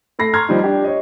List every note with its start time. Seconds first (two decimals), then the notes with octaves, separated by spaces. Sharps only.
0.19 A3 A4 B5 A#6 C7
0.33 A#5 C6 C#6 F6 G#6 A#6
0.49 F3 G3 D#4
0.64 D4 G4
0.84 C#5 D#5